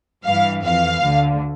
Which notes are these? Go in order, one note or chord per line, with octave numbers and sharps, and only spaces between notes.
G2 E3 F5
F2 E3 F5
D2 D3